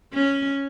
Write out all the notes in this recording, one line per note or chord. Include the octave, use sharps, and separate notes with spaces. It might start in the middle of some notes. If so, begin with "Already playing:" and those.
C#4